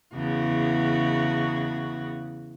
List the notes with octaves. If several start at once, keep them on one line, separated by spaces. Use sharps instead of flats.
E2 C#3 F#4